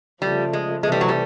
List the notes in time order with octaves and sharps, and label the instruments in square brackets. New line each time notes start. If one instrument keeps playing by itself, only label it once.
[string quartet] C#3 F3 A3 [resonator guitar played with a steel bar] G3
[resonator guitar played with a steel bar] G#3
[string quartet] C3 E3 A3 [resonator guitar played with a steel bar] G#3
[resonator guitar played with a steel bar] G3
F#3
G3